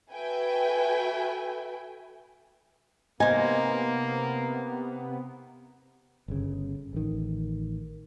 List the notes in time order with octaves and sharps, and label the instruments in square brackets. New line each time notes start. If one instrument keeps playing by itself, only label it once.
[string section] F#4 A4 B4 E5 G5 G#5
[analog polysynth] C3 B3 [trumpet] A#3 [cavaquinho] D#4 C5 [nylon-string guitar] G#5
[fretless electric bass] G1 C#3
A1 D#3